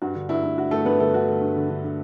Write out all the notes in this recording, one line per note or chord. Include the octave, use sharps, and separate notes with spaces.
G2 F#4
D3
G2 E4
G2
G2 F#4
G2 A3 A4
G2 B3 B4
D3 A3 A4
D3 F#4
D3
G2
D3
D3
D3